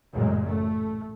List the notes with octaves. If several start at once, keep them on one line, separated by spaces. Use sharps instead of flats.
A1 F#2 A#2 C#3 G#3
A3